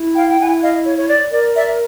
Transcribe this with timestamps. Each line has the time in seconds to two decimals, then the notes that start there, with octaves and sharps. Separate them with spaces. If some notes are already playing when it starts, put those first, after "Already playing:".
Already playing: E4
0.16 F5 G5
0.29 G5
0.39 E4 F#5 G#5
0.62 D#5 F5
0.86 C#5
0.98 C#5
1.09 D5
1.32 A#4 D5
1.56 D5 E5